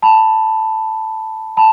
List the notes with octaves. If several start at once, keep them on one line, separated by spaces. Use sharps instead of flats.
A5 B5
A5 B5